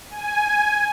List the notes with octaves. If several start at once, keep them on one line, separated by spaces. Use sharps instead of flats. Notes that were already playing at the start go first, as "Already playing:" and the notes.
G#5